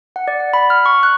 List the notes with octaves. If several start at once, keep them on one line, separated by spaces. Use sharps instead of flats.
F#5
D5
F#5
B5
F6
C#6
F#6